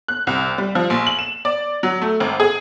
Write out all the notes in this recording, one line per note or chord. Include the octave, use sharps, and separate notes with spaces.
F#6
C2
G3
F3
A#1
F#7
E7
D5
F#3
A3
G#1
G#4